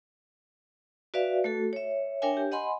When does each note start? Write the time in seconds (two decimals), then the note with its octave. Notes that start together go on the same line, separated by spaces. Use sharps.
1.14 F#4 B4 D5 E5 F5
1.44 A3 F#4 A4
1.73 C#5 E5
2.22 D4 A#4 C#5 E5 G5 G#5
2.37 G4
2.52 D#5 F#5 G#5 B5 C6